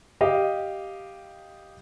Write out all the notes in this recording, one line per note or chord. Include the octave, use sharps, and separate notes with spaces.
G4 D#5 F5